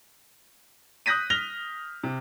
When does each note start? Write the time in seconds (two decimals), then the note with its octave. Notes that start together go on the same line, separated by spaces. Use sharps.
1.06 D#6 F#6 G6 A#6 B6 D#7
1.30 F6 A#6 F7 G7
2.03 C3